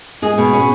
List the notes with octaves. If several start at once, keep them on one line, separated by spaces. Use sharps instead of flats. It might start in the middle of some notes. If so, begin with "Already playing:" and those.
G#3 G#4
B2
C#4